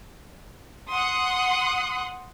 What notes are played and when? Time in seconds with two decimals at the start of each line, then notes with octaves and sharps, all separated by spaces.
0.90 F#5 C6 D#6